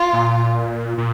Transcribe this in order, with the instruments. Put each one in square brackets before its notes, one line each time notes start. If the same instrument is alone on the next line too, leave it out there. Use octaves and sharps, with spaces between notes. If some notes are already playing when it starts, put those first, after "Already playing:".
Already playing: [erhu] F4
[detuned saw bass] A#2
A#2